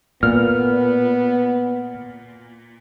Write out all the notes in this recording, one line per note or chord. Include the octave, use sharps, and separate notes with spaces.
A#2 B3 F6